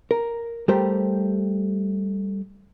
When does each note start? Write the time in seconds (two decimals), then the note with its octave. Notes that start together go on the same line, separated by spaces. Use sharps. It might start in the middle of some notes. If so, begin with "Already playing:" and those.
0.11 A#4
0.68 G3 A3 G4 A#4 C5